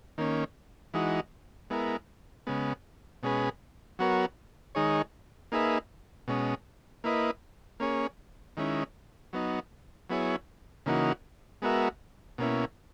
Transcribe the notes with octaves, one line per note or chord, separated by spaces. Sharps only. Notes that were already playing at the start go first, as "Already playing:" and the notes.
D#3 A#3 C#4
E3 G#3 D#4 F#4
G#3 B3 E4 A#4
C#3 G#3 B3
B2 G#3 C#4 G#4 B4
F#3 B3 F#4 A#4 C#5
D#3 G#3 D#4 G#4 C#5
A#3 D#4 G#4 B4 E5
B2 G#3 C#4
A#3 E4 B4 D#5
A#3 C#4 G#4 C#5
D#3 G#3 C#4 E4
F#3 B3 D#4
F#3 B3 E4 G#4 C#5
C#3 E3 A#3 D#4 F#4
G#3 B3 F#4 A#4 E5
B2 A#3 C#4 E4